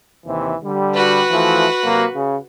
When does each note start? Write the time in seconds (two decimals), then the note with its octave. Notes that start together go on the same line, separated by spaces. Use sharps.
0.25 D#2 C3 E3
0.62 D3 G3
0.95 F#4 B4
1.30 E3 F3 A3
1.83 C3 F#3 A#3
2.14 C#3